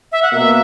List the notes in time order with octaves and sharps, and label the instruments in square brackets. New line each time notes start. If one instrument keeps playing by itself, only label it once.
[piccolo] E5
F#5
[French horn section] B2 A#3 [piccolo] E5